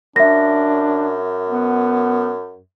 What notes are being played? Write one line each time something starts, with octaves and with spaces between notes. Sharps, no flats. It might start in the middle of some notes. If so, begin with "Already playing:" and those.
F#2 D4 E5 A#6
B3